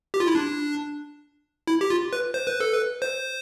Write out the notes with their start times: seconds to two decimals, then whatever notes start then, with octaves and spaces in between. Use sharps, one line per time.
0.14 G4
0.20 F4
0.27 E4
0.35 D4
1.67 E4
1.81 G4
1.90 F4
2.13 B4
2.34 C5
2.47 B4
2.60 A4
2.73 B4
3.02 C5